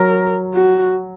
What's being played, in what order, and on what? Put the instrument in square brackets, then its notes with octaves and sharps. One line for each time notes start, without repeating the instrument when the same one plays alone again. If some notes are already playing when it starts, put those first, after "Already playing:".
Already playing: [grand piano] F#3 [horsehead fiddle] A#4
[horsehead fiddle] F#4